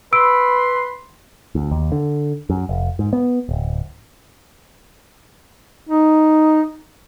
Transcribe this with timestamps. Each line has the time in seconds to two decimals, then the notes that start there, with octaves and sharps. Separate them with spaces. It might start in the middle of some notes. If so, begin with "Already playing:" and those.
0.13 B4 B5 C6 E6 D7
1.55 D2
1.71 D#2
1.92 D3
2.50 F#2
2.69 F1
2.99 G#2
3.13 B3
3.49 D1
5.89 D#4